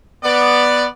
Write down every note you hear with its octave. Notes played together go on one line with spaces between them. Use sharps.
B3 D5